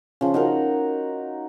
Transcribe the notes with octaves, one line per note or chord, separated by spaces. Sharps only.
C#3 F3
D#4 F#4 A#4